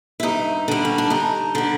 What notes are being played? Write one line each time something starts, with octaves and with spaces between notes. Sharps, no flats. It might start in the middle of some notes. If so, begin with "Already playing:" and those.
E4
G2 D#4
D3 G3
C#4
D4
G2 D#4
D3 G3